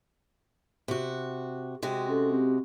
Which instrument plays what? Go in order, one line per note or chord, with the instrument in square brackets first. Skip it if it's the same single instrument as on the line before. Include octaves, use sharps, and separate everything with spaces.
[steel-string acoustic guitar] C3 F#4
[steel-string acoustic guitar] C3 G#3 F#4 [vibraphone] G5
[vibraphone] C#4 A4
C4 G4